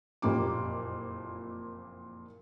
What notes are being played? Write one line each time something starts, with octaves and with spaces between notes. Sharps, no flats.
F#1 F2 A#2 A#3 G4 D6